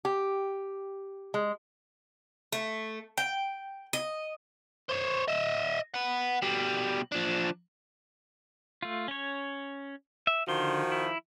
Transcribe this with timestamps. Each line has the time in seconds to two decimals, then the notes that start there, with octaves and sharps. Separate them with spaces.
0.05 G4
1.34 G#3
2.52 A3
3.17 G5
3.93 D#5
4.90 C5 C#5
5.28 D#5 E5
5.94 B4 F#5
6.42 B2 G3
7.12 F3 D4
8.82 A3 F4
9.08 C#4 C#5
10.27 E5
10.48 D3 D#3 F3 F#4 C6
10.92 E4